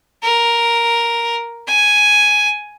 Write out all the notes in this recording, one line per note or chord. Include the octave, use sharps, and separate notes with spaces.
A#4
G#5